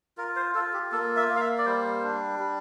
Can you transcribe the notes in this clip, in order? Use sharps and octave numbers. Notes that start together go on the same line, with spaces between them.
F4 A#4
C5
F4 A4
G4
A#3 A4
E5
A#3
F5
E5
D5
G3 C5
D4
G3